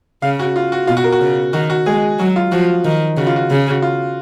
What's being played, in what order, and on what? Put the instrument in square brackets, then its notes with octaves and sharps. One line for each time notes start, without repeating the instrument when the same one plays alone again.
[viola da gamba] C#3 [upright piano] F5
[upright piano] F#4
F4
F#4
[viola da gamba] B2 [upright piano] F4
[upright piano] F#4
A#4
F#4
[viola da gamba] C#3
[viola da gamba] D#3 [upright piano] F#4
[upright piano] F#4
[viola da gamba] G#3 [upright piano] G#4
[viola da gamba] F#3 [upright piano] F#4
[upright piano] F4
[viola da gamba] F3 [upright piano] F#4
[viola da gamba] D#3
[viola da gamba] C#3 [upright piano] F#4
[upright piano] F4
F#4
[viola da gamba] C#3
[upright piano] F#4
F4